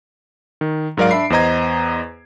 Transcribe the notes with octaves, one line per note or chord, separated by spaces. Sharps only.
D#3
G#2 F#3 A#4 D5 F5 D7
D4 E5 B5 C7
E2 B3 C5 D#5 A#5 G#6